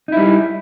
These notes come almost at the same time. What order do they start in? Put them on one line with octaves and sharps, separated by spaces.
D#4 E4 G3